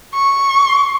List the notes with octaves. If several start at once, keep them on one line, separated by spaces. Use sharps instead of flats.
C#6